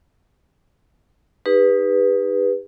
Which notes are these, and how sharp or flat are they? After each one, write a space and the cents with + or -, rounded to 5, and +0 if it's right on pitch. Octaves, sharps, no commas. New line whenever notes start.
D#4 +0 G4 +40 B4 -5